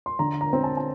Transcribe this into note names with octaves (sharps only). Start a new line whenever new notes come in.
C6
D3 A#5
A#5
C4
A5
A5